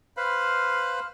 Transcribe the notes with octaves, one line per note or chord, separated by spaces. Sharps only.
B4 C5 F5 B5